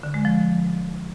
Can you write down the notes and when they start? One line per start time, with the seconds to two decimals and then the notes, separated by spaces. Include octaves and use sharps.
0.03 D3
0.14 G#3
0.25 F3